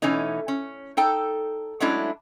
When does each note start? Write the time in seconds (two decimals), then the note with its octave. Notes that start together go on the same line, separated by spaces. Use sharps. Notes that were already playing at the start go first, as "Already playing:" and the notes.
0.02 B2 E3 A3 C#4 D#4
0.48 C#4
0.97 D#4 A4 G5 A5
1.80 F#3 G#3 A3 C#4 D4 E4